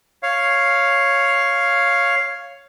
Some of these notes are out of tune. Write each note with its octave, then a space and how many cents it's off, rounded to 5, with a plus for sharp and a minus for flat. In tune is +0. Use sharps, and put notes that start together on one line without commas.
C#5 +0 F5 +0